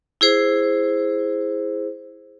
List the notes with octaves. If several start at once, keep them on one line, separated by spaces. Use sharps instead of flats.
E4 G#4 C5